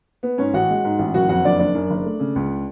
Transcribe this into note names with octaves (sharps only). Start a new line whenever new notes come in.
B3
G#2 C#4 C#5
A1 F#4 F#5
G#3
G#2
A1
F#1 F#4 F#5
F2 F#4 F#5
F#1 D4 D5
F#1 D4 D5
F#2
F#1
A3
C#3
C#2